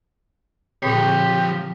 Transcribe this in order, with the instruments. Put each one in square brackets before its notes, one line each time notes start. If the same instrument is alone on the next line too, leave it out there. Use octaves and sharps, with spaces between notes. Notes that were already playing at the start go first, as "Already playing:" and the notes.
[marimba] A#2 D3 C4 [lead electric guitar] F3 C#5 [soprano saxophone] G4